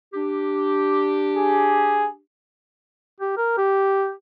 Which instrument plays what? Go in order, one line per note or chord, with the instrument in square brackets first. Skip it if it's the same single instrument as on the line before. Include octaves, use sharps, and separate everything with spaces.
[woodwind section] D4 G4
[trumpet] G#4
[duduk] G4
A#4
G4